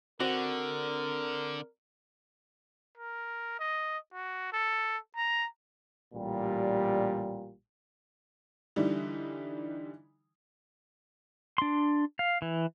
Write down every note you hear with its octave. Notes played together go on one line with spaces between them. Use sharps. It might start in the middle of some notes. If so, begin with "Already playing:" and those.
D3 C4 F#4 A#4 D5
A#4
D#5
F#4
A4
A#5
A1 A#2 G3
D3 E3 G3 D#4
D4 C6
F5
E3